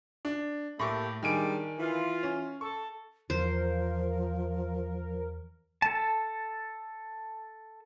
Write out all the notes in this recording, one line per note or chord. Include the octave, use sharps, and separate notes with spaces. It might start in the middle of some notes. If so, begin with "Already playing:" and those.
D4
A2 A3 A#3 G4 C#6
D#3 G3 G#3 D4 G#5 D7
E3 F4
C#4
A4 C#6
E2 F3 A#4 C5
A4 A5